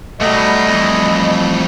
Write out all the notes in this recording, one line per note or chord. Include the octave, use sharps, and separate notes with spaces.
B2 F#3 G3 A3 D#5
F2 E3